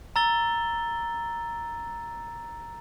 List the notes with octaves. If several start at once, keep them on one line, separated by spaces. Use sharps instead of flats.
A#5 E6 A6 G7